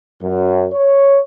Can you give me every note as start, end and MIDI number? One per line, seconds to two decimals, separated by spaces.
0.22 0.67 42
0.73 1.19 73